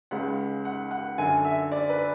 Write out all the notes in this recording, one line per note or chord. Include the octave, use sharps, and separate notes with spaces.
C#2 C#3 G#3 F#5
F#5
F#5
F#2 D3 F#3 G#5
E5
D5
B4